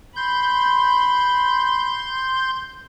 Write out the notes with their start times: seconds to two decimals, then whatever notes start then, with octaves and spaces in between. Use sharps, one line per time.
0.16 B5 C6 G6